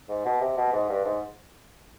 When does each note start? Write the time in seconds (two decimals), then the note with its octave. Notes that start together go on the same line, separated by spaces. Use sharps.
0.09 G#2
0.25 B2
0.41 C3
0.57 B2
0.73 G#2
0.90 G2
1.05 G#2